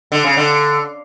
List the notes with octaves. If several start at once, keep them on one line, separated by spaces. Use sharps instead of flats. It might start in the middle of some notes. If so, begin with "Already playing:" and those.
D3
C#3
D3